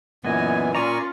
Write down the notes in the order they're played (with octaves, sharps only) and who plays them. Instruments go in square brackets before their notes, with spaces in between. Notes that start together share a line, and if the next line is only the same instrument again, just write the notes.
[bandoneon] F#2 A#2 E3 [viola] A#3 G#5 [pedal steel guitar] B3 D#5
[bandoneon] A#2 D5 C#6 [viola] C#4 F4 [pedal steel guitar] A#4 G#5 A#5